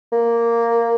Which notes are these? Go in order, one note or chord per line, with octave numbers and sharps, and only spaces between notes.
A#3